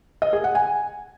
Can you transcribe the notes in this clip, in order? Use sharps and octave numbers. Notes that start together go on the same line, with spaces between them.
D#5
G#4
F#5
G#5